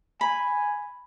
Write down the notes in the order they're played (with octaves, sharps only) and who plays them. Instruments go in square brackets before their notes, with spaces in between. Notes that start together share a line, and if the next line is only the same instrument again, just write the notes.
[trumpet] G#5 [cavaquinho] B5